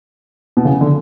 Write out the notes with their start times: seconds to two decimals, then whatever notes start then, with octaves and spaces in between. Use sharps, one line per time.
0.57 B2
0.65 C#3
0.81 D3